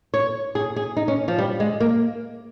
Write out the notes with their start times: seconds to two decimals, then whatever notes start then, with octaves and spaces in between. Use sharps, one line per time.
0.14 C#5
0.55 G#4
0.76 G#4
0.97 D#4
1.08 C#4
1.28 F3
1.39 G3
1.60 G#3
1.80 A#3